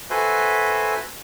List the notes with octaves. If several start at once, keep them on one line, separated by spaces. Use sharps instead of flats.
F#4 A4 B4 C5 E5 G#5